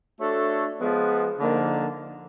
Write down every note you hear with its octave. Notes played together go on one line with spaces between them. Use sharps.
A3 D4 F#4 A4 C#5
F3 G#3 B3
D3 F3 A#3 D#4